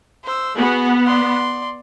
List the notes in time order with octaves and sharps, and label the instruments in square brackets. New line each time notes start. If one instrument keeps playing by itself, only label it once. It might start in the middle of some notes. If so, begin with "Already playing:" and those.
[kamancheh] C5 E6
[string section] B3 [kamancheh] F#4 G#4
[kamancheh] D5 C6